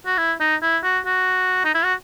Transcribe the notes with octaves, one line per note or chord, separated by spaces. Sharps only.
F#4
E4
D#4
E4
F#4
F#4
D#4
E4
F#4